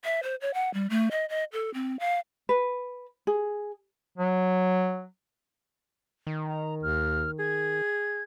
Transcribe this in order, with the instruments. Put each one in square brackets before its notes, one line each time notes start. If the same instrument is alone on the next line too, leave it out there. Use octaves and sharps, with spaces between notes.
[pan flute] E5
C5
C#5
F#5
G3
A3
D#5
D#5
A4
C4
F5
[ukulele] B4
G#4
[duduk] F#3
[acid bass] D#3
[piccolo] A#5
[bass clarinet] D#2 [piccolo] F6
[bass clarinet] G#4 [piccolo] G#6